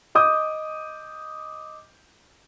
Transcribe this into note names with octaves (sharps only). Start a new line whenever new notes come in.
D#5 D6 D#6 G6